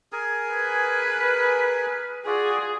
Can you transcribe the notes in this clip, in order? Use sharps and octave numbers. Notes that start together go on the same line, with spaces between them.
G#4 A#4 G#5
B4
F4 F#4 G#4 D5